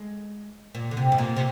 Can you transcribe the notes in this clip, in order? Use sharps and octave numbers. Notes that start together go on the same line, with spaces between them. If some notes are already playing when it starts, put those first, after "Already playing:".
Already playing: G#3
A#2
D3
C3
G#2
A#2
C3